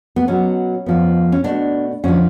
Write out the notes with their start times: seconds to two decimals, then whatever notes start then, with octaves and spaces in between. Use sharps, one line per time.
0.16 B3
0.27 B2 F#3 B3 C#4
0.86 F2 F3 B3
1.32 C#4
1.44 B2 A3 D4
2.03 F2 D3 F3 C#4